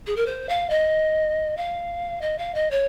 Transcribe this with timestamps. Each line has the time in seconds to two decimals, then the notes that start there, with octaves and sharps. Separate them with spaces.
0.07 G#4
0.16 A#4
0.26 C5
0.49 F5
0.70 D#5
1.57 F5
2.21 D#5
2.38 F5
2.55 D#5
2.71 C#5